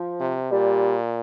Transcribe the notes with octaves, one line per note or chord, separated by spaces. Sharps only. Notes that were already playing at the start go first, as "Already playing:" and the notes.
Already playing: F3
C3
A#2 G3